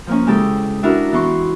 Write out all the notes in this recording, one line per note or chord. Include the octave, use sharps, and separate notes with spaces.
F3 A#3 C#4
C#3 G#3 E4 G4 A4
D4 E4 F#4 A#4
E3 B3 C6 C#6